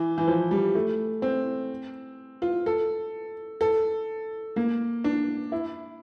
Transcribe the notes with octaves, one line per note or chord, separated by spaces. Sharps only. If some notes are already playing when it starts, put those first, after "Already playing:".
Already playing: E3
E3
F3
G3
A3
C4
F4
A4
A4
A#3
D4
E4